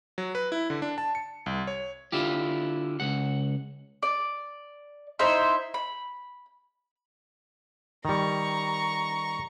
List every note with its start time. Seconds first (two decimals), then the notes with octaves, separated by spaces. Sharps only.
0.18 F#3
0.35 B4
0.52 E4
0.70 D3
0.82 D4
0.98 A5
1.15 C#7
1.46 C2
1.67 C#5
2.12 D3 E4 F4 G4
3.00 C#2 F#5
4.03 D5
5.19 D#4 E4 C5 E5
5.74 B5
8.05 D#3 G3 A#5 C#6